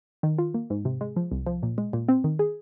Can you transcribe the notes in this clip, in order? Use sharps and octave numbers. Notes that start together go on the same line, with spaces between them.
D#3
F4
A#3
G#2
C3
G#3
F3
C2
F3
A#2
G#3
A#2
C4
D#3
G#4